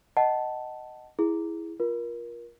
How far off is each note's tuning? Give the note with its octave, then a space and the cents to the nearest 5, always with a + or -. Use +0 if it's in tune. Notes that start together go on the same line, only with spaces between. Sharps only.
D#5 +0 F#5 +20 A5 +0
E4 +0 G#4 +0
F4 +0 A#4 +25